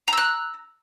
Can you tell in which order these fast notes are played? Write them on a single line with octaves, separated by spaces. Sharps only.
A#5 E6 F#6